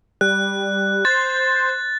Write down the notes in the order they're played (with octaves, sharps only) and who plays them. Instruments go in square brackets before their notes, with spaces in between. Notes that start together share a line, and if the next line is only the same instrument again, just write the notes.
[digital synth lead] G3 [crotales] F#6
[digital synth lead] C5 [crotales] A6